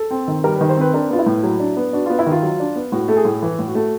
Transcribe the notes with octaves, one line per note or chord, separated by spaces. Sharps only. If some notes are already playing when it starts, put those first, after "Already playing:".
Already playing: A4
C4
D#3
G3 A#4
B4
D#3
C5
C4 B4
D4 A#4
B3 F4
E4
A2
F#3
D4
B3
D4 F#4
B3 F4
E4
D#3
F4
F#3
D4
B3
A2 F#4
A3 A4
G#4
A2
E3
A2
F#4
A3